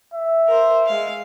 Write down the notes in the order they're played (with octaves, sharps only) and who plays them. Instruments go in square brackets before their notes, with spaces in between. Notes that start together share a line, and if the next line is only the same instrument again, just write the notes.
[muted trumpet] E5
[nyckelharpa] A#4 C5
G#3 F5